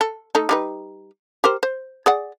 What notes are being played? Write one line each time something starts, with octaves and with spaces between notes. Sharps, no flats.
A4
A3 D#4 A4
G3 D#4 B4
G4 A#4 C5
C5
G#4 D5 F#5